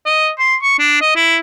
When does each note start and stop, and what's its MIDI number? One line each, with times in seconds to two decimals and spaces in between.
0.06 0.30 75
0.39 0.55 84
0.63 0.74 85
0.79 1.01 62
1.02 1.15 75
1.16 1.37 64